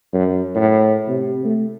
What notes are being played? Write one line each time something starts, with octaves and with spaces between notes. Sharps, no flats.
F#2
A2
C3
A3